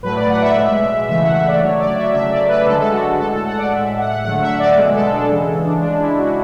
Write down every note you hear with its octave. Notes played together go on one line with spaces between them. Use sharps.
A2 F#3 A3 B4
D5
F#5
E5
B2 G#3
C#3 E3 A3 E5
F#5
E5
D5
D3 F#3 A3 C#5
D5
E5
C#3 F#3 A3 E5
D5
B4
D3 G#3 A4
A4
F#4
A2 G#3 A4
A4
F#5
D5
A2 G#3 E5
F#5
F#5
D3 F#3 A3 F#5
E5
D5
B2 G#3
A4
D4
C#3 E3 G#3
D4
C#3 G#3 D4
E4
F#4